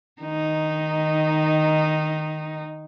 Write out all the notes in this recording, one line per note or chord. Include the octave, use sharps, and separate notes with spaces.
D#3 D#4